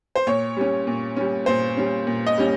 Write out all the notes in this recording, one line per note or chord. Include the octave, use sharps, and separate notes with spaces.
C5
A#2 C#5
G3 C#4
A#2
G3 C#4
A#2 C5
G3 C#4
A#2
D#5
G3 C#4